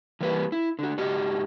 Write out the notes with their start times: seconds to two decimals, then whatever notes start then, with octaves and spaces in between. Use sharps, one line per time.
0.21 E3 G3 A#3 B4
0.52 E4
0.79 D3 F#4
0.98 G#2 F#4 G4 D#5